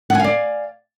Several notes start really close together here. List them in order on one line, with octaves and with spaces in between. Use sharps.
F#5 G#5 F5 D5